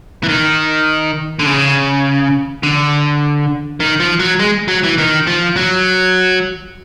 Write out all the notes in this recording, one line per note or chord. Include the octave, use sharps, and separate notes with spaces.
E3
D#3
D3
C#3
D3
D#3
F3
F#3
G#3
F#3
E3
D#3
F3
F#3